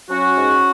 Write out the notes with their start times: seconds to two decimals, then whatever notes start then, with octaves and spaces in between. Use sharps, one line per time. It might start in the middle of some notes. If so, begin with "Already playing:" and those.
0.09 F#3 C#4 F#4
0.35 G#2